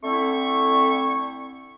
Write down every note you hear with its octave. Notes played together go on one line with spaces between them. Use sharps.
D3 A3 C4 E4 C#6